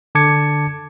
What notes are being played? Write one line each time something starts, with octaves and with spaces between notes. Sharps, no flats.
D3 A5 D6 G#6 C#7